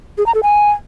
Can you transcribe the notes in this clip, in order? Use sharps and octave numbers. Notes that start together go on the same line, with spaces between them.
G#4
A#5
A4
G#5